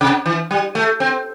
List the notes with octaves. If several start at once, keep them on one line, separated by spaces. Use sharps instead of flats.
C3
E3
G3
A3
C4